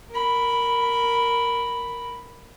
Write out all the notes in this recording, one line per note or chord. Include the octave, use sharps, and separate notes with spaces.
A#4 B5